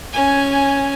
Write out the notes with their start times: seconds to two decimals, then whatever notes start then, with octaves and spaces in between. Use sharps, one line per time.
0.13 C#4 G#5